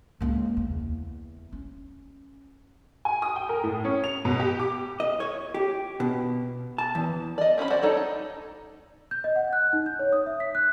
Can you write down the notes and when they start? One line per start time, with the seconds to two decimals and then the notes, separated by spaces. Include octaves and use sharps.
0.21 C#2 A#3
0.57 E2
1.53 C#4
3.05 G#5
3.22 D#6
3.36 G5
3.49 A#4
3.64 A2
3.85 C#4
4.04 F7
4.25 B2
4.40 G4
4.60 D6
5.00 D#5
5.20 C#5
5.54 G4
6.00 B2
6.78 A5
6.95 E2
7.38 D5 D#5
7.58 C4 C#4 C5 B5
7.70 F#4 C5 D5
7.82 D#4 A4 C#5 D5
7.97 D#4
9.11 G6
9.24 D#5
9.36 F#5
9.53 F#6
9.73 D#4
9.86 G6
9.99 C#5
10.12 D#6
10.26 E5
10.40 B6
10.55 F#6